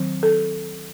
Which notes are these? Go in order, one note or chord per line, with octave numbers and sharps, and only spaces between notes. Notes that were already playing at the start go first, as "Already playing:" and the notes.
Already playing: D#3 F#3 C4
A4